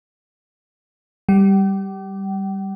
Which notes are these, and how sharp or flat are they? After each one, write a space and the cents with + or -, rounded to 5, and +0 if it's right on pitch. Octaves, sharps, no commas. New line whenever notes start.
G3 +0 G5 -40